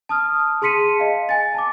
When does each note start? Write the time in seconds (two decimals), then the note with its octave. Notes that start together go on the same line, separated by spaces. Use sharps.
0.09 A5 D#6 F6
0.62 G#4 A5 C6 B6 C#7 D#7
1.00 D#5 F5
1.29 G#5 A6
1.54 A5 D6